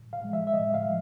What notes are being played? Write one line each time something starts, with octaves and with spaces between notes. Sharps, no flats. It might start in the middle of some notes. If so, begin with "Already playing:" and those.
Already playing: A2
F5
F3 G#3
E5
E5
A2 D#5
F5
F3